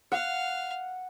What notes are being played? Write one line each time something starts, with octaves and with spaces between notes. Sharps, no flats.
F5 F#5